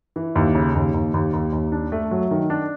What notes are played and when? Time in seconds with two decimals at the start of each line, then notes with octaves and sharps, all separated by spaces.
0.16 E3
0.35 D#2
0.55 C#3
0.75 D#2
0.94 D#2
1.14 D#2
1.33 D#2
1.53 D#2
1.72 D4
1.92 A3
2.11 F#3
2.31 D#3
2.50 D4